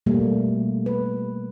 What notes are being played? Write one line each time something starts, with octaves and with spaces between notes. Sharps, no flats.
B2 G3 A3 A#3
B4